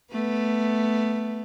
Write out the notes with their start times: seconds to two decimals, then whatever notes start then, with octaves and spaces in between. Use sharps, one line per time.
0.12 A3 B3